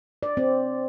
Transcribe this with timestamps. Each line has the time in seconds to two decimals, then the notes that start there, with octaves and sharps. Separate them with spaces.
0.23 D5
0.37 C4